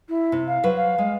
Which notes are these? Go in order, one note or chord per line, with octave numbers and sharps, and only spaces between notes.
E4
C3
F5
F#3 B4 C5
F5
G#3